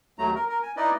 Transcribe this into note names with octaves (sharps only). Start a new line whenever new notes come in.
D#2 F#3 A3 A#5
A#4
A#4
G#5
D#4 E4 B4 D5 D#5